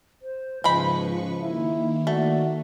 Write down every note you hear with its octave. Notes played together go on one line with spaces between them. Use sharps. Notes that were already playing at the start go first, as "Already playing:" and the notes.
C5
G#2 C#3 F3 G#3 B4 C5 B5 C#6
D#3 A#3 E4
A3 F#4 D5